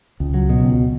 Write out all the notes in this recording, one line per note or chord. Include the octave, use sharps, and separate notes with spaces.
C#2
F#3
B2
C#2